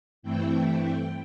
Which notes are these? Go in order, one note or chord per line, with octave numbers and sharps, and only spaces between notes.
G2 E3 A3 C4 E4 G5